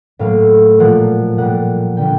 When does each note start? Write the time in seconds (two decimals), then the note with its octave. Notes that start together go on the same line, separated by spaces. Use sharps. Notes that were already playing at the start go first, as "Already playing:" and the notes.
0.19 A2 F#3 A#3 F5
0.79 A#2 F3 A#3 F#5
1.38 A#2 G3 A#3 F#5
1.97 D3 G3 A#3 G5